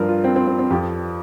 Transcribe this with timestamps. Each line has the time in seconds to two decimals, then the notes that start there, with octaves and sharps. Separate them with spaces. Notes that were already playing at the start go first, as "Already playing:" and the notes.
Already playing: G2 F3 A#4
0.09 F4
0.24 C4
0.36 C4
0.47 C4
0.59 C4
0.71 F2 F3 G4